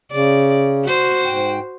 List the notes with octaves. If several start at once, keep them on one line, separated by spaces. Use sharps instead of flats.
C#3 D5
F#4 C5
G#2 G5